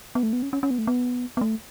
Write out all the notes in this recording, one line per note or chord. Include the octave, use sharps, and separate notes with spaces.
B3
A3
B3
C#4
C#4
C#4
B3
A3
B3
B3
A3